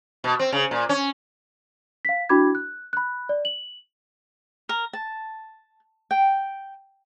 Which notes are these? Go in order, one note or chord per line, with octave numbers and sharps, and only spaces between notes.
B2
C4
C#3
A#2
C#4
F5 B6
D4 E4 F#4 B5 D6 G#6
F#6
B5 F#6
D5
F#7
A#4
A5
G5